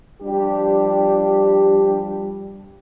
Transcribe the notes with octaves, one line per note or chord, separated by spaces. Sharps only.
F3 G3 D4 G4